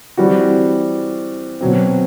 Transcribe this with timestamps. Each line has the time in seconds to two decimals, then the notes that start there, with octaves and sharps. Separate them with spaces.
0.17 E3 G3 C4 F#4
1.61 B2 F#3 C4